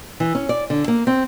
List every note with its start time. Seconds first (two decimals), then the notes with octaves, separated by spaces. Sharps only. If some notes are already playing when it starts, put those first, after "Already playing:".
0.20 E3
0.35 C#4
0.49 D5
0.70 D3
0.88 A#3
1.07 C4